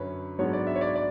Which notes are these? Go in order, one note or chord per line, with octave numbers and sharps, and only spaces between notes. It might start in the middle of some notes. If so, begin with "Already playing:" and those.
Already playing: F#2 D3 F#3 C#4 B4
G#2 F#3 B3 D4 C#5
D5
E5
C#5
D5
D5